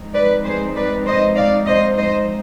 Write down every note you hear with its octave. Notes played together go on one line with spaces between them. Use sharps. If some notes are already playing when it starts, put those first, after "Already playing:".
Already playing: F3 G#3 C4 D#4
B4 D5
G#4 C5
B4 D5
C5 D#5
D5 F5
C5 D#5
C5 D#5